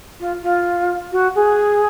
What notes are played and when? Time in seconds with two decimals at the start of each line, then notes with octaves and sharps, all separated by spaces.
0.20 F4
0.43 F4
1.11 F#4
1.35 G#4